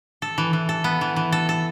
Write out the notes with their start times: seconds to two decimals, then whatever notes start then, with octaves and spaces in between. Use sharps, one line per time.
0.22 A4
0.38 E3
0.53 E3
0.69 A4
0.84 B3
1.01 E3
1.16 E3
1.32 A4
1.49 A4